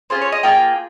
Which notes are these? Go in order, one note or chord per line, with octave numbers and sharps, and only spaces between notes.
C#4 F4 G#4 C5
C#5
D#5
A#3 F4 G#4 G5